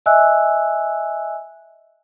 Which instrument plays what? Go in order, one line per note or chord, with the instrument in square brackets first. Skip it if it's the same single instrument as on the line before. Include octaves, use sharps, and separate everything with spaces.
[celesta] D#5 E5 G#5 E6 F#6